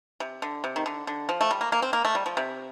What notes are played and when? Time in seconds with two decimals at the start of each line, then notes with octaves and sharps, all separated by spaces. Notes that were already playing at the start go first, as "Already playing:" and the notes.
0.20 C3
0.42 D3
0.64 C3
0.76 D#3
0.86 D3
1.07 D3
1.29 F3
1.41 A3
1.51 G3
1.61 A#3
1.72 A#3
1.82 C4
1.93 A#3
2.05 A3
2.15 G3
2.26 F3
2.37 C3